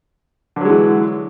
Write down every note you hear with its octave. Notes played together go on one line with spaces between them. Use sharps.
D3 E3 F#3 G#3